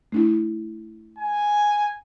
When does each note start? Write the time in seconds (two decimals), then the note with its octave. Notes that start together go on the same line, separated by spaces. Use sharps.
0.12 A3 D4 E4
1.18 G#5